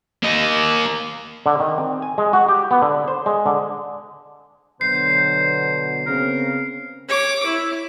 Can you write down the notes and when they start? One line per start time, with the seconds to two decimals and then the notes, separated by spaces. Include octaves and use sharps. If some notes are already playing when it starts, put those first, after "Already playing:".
0.23 A#3 D#5
1.46 D3
1.60 D#3
1.78 C4
2.02 G#5
2.18 G#3
2.33 F#4
2.48 G4
2.71 B3
2.82 D3
3.08 C5
3.26 G#3
3.46 D3
4.81 B2 D3 F#3 C5 C7
6.06 C#3 B3 C4 A#4
7.08 C#5 D6
7.46 E4